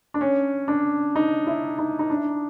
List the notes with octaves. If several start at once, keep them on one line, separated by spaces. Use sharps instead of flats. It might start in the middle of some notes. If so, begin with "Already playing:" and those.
D4
C#4
D4
D#4
E4
D#4
D#4
D4